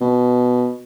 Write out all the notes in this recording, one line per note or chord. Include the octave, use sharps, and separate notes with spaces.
B2